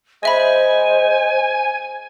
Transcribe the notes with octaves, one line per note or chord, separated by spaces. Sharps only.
G#3 C5 D#5 E5 G#5 B5